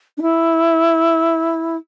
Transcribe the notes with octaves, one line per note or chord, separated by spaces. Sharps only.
D4
E4